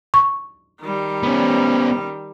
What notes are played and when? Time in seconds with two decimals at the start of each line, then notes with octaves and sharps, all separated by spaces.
0.14 C#6
0.81 D#3 G3
1.23 B3 C#4